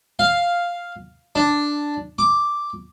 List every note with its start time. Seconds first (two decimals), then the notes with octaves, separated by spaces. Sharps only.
0.19 F5
1.36 D4
2.19 D6